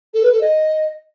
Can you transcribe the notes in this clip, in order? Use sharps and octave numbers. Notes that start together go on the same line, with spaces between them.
A4
B4
A4
D#5